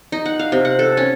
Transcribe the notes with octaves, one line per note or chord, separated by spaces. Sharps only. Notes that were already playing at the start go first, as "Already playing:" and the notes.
D#4
F#5
F5
C3
F#5
A4
C#4